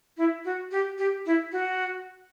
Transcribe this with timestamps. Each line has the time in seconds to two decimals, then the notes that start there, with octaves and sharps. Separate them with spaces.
0.17 E4
0.45 F#4
0.71 G4
0.98 G4
1.26 E4
1.52 F#4